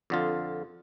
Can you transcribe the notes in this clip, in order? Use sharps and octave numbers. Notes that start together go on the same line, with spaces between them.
F2 D3 F4